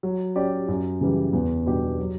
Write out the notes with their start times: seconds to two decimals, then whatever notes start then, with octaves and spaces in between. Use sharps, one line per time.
0.03 F#3
0.36 C#4 G4 D5
0.68 F#2
1.01 C#3 E3 G3
1.33 E2
1.66 B2 G3 D4 G4
1.98 F#3